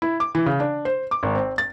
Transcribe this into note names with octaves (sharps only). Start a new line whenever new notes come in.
E4
D6
E3
C#3
D4
C5
D6
G#1
C4
A6